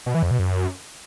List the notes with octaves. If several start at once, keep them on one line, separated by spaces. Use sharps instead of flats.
B2
E3
F2
B2
F#2